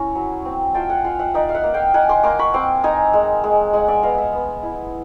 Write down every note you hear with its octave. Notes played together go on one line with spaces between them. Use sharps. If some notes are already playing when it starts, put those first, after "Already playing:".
Already playing: C#4 E4 G#5 A#5
F#3
C4
F4 G5 A5
F#5 G#5
F4 F5 G5
E5 F#5
D#4 D5 E5
F5
E5 F#5
A#3
F5 G5
D#4 F#5 G#5
C6 D6
A#3 C6 D6
B5 C#6
C4 C6 D6
D#4 G#5 A#5
G#3
G#3
G#3 F#5 G#5
D5 E5
B3 D#5 F5
E5 F#5
B3
E4